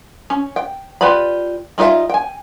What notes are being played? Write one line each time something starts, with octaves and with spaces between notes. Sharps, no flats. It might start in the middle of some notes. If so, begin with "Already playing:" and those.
C#4
G5
F4 G4 B4 D5 B5
G3 D#4 F4 B4 E5
G5 G#5